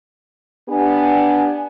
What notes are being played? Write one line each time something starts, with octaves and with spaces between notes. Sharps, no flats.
B3 D4 G4 G#5